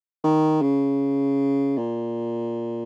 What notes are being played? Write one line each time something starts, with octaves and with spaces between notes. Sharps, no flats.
D#3
C#3
A#2